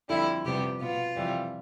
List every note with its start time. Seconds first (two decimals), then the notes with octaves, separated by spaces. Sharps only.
0.09 F2 D3 G3 E4
0.44 F2 C3 G3 B3 G4
0.80 B2 B3 F4
1.16 F2 C3 E3 G3